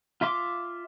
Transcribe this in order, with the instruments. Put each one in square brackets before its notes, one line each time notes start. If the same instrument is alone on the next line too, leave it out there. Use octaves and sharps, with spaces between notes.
[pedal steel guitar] F4 E5 C6 D6